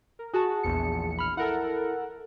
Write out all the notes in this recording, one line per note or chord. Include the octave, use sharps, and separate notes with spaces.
A#4
F#4 G#4 A5
A#1 E2 C#7
B5 F6
E4 A4 A#4 F#5